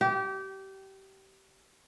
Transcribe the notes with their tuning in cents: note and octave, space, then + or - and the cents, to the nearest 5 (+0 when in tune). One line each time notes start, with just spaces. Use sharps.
G4 -25